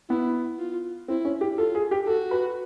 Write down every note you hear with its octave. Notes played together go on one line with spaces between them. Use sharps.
B3 E4
F4
C4 E4
C#4
G4
F4 A4
G#4
G4
F#4 A4
B4